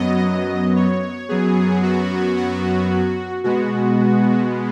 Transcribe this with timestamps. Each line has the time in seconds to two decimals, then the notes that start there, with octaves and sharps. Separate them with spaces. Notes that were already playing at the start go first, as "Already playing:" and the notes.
Already playing: F#2 F#3 B3 D#5
0.76 C#5
1.29 F#2 F#3 B3 G#4
1.83 F#4
2.37 F#4
3.44 B2 G#3 B3 F#4